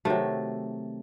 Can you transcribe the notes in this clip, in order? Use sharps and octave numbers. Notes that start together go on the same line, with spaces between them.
C3 D#3 F#3 A3